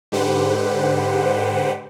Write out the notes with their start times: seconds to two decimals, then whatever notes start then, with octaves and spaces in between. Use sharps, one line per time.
0.12 G#2 D3 G4 B4 C5 F#5